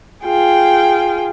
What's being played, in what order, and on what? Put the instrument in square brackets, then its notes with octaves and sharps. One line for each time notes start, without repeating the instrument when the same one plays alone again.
[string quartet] F4 G#4 G5